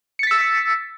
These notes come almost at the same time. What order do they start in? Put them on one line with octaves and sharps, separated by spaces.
C#7 A6 B6 E6